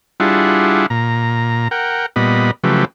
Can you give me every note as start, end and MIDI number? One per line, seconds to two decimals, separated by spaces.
0.20 0.86 55
0.20 0.86 62
0.20 0.86 64
0.20 0.86 65
0.20 0.86 68
0.20 0.86 78
0.90 1.68 46
0.90 1.68 82
1.71 2.06 70
1.71 2.06 78
1.71 2.06 79
2.16 2.51 46
2.16 2.51 55
2.16 2.51 59
2.16 2.51 75
2.16 2.51 83
2.64 2.85 49
2.64 2.85 53
2.64 2.85 54
2.64 2.85 57
2.64 2.85 67
2.64 2.85 71